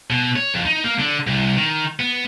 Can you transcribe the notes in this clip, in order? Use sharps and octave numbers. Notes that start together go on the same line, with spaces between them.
B2
C#5
F2
D#4
A#3
D3
C2
D#3
B3